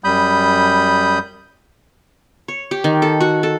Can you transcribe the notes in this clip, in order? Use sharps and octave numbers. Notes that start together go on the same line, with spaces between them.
F#2 G3 B5 D#6 G6
C#5
G4
D#3
A4
F#4
A4